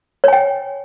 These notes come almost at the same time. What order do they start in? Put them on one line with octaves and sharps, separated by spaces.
C#5 G#5 G5